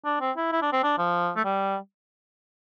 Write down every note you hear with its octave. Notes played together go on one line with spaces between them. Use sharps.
D4
C4
E4
E4
D4
C4
D4
F3
A3
G3